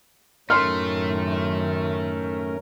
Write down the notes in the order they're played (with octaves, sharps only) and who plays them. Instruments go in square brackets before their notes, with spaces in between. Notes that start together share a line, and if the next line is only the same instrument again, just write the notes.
[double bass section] F#2 A2 D#3 [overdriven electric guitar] A3 [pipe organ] C#4 A#4 [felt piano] C6 F6